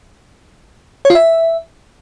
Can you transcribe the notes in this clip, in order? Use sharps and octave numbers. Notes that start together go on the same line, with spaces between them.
C#5
F4
E5